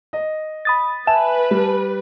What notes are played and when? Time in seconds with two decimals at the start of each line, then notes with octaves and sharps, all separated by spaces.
0.13 D#5
0.65 B5 D#6 A6
1.07 B4 E5 G#5 A5 E7
1.51 G3